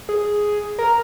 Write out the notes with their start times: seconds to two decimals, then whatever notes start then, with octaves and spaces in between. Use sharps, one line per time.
0.09 G#4
0.79 A#4